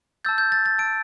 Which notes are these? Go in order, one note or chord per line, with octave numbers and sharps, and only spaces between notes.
A5 E6 G6 A6
G6
A6
A6
A5 E6 G6 D7